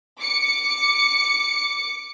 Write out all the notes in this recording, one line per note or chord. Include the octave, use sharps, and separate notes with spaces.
D6 C#7